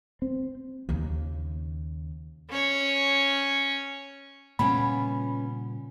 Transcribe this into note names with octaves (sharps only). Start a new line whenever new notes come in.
C4
D#2 C#3
C#4 C#5
A#2 C#3 G3 B3 C#4 F5 B5